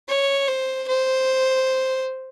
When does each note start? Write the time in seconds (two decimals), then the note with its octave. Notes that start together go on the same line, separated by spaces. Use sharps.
0.09 C#5
0.48 C5
0.88 C5